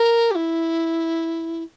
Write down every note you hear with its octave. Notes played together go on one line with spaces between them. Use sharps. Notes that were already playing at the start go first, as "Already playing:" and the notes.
Already playing: A#4
G4
E4